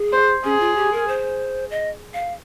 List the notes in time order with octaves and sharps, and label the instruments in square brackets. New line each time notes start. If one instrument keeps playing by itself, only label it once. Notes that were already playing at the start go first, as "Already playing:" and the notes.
Already playing: [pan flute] G#4
[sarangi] C5
[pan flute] C#4 [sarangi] G#4
[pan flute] F4
G4
A#4
C5
D#5
F5